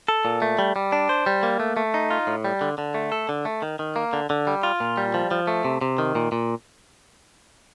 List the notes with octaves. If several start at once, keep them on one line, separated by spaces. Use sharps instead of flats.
A4
A#2
A3
G3
G3
D4
C5
G3
A#3
A3
A3
D#4
F4
A2
G3
D3
D3
A3
A4
D3
A3
D#3
D#3
A#3
D3
D3
G3
F4
A#2
G3
F3
F3
A3
C3
C3
D#3
A#2
A#2